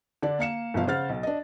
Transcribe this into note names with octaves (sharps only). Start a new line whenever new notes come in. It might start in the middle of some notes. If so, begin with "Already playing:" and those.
D3 D4 D5
A#3 F5 C#7 E7
G1 B2 F3 F5
C#3 C5 F#5 F6 A6
B1
D4 D#5